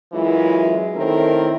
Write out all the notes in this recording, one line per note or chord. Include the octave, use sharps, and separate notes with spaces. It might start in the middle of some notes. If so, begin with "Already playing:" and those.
F#2 E3 F#3 G#3 E4 F4
D#3 A3 C4 C#4 E4 A#4